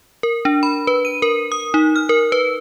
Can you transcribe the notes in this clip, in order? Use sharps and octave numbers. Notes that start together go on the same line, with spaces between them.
A#4
D4
B5
B4
D#7
A#4
D#6
D#4
F6
A#4
B4